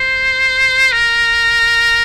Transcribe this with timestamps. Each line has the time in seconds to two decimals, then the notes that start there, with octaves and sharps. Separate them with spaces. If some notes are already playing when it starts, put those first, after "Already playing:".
Already playing: C5
0.92 A#4